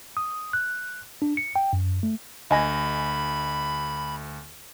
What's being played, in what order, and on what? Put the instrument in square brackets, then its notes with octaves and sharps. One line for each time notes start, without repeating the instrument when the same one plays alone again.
[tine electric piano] D#6
F#6
D4
C#7
G5
F#2
A3
[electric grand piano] D2 [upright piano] D#5 G#5 A#6 [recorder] B5